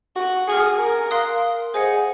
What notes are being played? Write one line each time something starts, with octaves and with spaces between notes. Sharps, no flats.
F#4
G#4 F#5 C#6 F6
A#4
F5 C6 D#6 F#6
G#4 C5 D#5 F#5